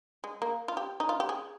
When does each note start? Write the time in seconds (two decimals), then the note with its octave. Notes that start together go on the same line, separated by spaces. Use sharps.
0.24 G#3
0.42 A#3
0.68 F4
0.77 G4
1.00 D#4
1.09 F4
1.20 G4
1.29 G#4